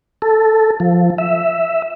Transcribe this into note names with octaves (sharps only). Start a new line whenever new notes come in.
A4
F3
E5